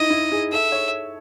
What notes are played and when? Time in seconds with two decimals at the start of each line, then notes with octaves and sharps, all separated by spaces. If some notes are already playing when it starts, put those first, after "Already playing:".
Already playing: D#4 E4 D#5
0.10 E4
0.32 G#4
0.52 A4 E5
0.72 C#5